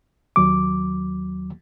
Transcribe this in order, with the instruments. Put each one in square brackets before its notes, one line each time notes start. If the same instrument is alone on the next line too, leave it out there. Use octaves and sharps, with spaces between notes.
[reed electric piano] D#2 F#3 D6